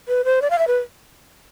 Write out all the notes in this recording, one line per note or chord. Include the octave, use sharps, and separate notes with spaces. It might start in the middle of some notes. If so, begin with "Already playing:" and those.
B4
C5
D5
F5
E5
B4